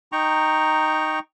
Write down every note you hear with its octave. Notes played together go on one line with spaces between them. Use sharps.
D#4 G5 A#5 C#6